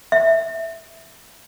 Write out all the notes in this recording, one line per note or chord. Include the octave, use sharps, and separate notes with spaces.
E5